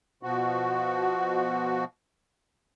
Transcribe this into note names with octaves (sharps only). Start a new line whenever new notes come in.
B2 F3 F#4